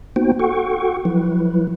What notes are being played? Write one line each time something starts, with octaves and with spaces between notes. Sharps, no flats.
A#3 B3 D#4 F#4 C5 G5
F#4 A4 F#5 G5 C#6
F3 F#3 E4 B4